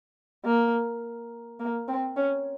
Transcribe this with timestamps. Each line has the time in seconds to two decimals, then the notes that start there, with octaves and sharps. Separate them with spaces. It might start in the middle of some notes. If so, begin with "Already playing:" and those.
0.45 A#3
1.60 A#3
1.88 C4
2.16 C#4